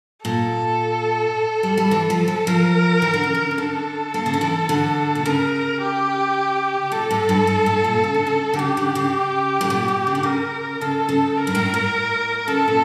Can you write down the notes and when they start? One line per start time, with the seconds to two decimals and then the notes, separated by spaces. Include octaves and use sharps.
0.25 A#2 A4
1.63 G3
1.77 G3
1.91 E3
2.10 F3
2.28 E3
2.47 F3 A#4
3.02 E3
3.14 D3
3.24 C#3
3.35 D3
3.51 C#3
3.58 D3 A4
4.14 A#3
4.26 C#3
4.34 D3
4.41 E3
4.69 D3
5.15 A#2
5.25 C#3 A#4
5.81 G4
6.92 A#2 A4
7.11 A2
7.29 G2
7.47 G2
7.66 A2
7.84 A#2
8.04 C#3
8.14 D3
8.27 C#3
8.53 D3
8.58 C#3 G4
8.77 D3
8.95 C#3
9.61 A2
9.70 A#2
9.88 A#2
10.07 C#3
10.15 D3
10.23 C#3 A#4
10.81 C#3 A4
11.09 C#3
11.37 A#4
11.47 G2
11.55 A2
11.74 A2
12.47 C#3 A4
12.68 A#2